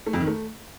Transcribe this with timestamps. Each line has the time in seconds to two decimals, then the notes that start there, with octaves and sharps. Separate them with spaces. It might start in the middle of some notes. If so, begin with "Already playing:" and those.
0.06 A3
0.13 F2
0.20 D#3
0.27 A3